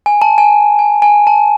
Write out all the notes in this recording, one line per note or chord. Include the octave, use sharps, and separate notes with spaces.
G#5
A5
G#5
G#5
G#5
A5